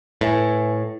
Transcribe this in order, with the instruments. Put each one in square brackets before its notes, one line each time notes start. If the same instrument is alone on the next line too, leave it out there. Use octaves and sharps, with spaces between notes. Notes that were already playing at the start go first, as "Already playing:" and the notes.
[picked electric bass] A2 [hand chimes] B4 E5 G#5